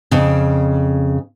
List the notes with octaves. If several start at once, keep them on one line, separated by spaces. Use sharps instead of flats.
F2 C#3